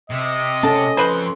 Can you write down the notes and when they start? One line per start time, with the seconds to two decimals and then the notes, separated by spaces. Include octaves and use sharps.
0.10 C3 D#5
0.63 C#4 A4 A5
0.97 F2 B4 C5 C6